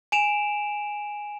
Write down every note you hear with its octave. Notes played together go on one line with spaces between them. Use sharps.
G#5 D7 E7 F7